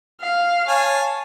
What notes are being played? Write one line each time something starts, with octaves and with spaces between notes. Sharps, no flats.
F5
C#5 G#5 A5